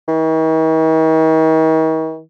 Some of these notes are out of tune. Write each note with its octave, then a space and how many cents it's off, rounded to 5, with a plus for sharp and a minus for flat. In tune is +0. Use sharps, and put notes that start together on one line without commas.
D#3 +45